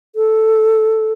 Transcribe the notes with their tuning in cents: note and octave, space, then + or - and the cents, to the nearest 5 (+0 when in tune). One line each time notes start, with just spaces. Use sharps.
A4 +0